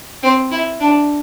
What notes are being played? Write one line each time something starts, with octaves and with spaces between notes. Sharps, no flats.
C4
E4
D4